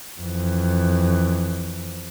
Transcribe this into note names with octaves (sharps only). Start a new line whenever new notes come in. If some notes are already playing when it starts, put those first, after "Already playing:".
F2 E3